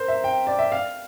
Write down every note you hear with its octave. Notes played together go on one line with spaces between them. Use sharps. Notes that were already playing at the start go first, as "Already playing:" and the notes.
Already playing: A#4 C5
E5
G5
D5
E5
F5